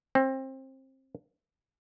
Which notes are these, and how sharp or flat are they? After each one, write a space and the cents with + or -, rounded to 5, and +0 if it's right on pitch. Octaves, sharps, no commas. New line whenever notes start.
C4 +25